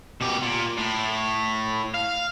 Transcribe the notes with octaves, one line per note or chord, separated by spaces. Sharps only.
B2 G4
A#2
A2
F5